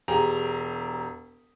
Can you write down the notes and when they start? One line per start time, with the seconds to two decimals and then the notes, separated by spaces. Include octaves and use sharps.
0.08 E1 G4 G#4 A#5